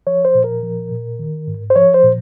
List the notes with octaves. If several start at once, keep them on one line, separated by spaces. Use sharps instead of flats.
F3 C#5
C5
A#2
A#4
F3
A#2
D#3
G#2
C5
F3 C#5
C5
A#2